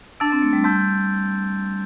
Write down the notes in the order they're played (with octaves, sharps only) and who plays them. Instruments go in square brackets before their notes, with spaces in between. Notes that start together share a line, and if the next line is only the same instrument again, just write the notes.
[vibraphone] D4 [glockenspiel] A5 E6 A6 D7
[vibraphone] C4
A3
G3
[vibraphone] G3 [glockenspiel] A5 C6 E6 G6